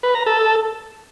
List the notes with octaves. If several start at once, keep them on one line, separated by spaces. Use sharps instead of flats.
B4
A#5
A4